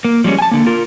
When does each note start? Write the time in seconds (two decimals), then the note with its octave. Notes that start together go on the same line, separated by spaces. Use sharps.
0.05 A#3
0.24 F3 G3 G#3 C#4
0.39 G#5 A5
0.51 D3 A#3
0.66 F4 A#4